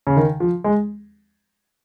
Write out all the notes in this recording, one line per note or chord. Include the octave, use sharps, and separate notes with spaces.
C#3
D#3
F3
G#3